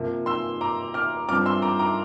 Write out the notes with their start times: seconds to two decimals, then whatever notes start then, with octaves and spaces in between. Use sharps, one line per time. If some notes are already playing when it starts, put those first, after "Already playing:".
Already playing: C3 F3 A#3
0.26 C6 E6
0.61 A#5 D6
0.94 D6 F6
1.29 G2 F3 C4 D6 F6
1.46 C6 E6
1.62 A#5 D6
1.79 A#5 D6